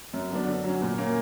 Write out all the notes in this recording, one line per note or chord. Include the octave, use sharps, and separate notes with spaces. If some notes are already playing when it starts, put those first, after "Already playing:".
F#2
D3 F#3 B3 D4
D3
F#3 C#4
A#2
A#3 C#4